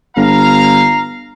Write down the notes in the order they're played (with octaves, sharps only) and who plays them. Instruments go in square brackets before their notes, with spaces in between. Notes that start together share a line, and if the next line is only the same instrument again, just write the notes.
[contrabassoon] G1 [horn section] F5 A#5